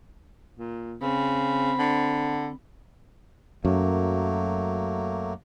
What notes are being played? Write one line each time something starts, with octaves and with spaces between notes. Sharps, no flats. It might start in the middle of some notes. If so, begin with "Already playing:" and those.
A#2
C#3 C4 B5
D3
F#2 F#3 A3 A#3